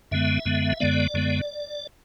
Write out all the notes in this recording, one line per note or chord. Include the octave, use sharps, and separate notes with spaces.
F#2 D3 G#3 B3 E5
F#2 D3 G#3 B3
F#2 D3 G#3 B3 D5
F#2 D3 G#3 B3